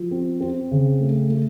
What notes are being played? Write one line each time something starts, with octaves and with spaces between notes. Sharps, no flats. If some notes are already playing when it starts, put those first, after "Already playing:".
Already playing: F3
C4
C4
C#3
A3
A3